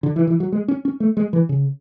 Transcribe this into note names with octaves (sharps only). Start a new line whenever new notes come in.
D3
E3
E3
F#3
G#3
C#4
C#4
A3
G#3
E3
C#3